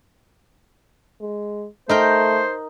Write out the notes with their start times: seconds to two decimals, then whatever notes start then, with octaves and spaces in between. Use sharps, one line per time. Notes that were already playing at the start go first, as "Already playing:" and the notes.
1.21 G#3
1.89 A3 D#4 A#4 C5 G5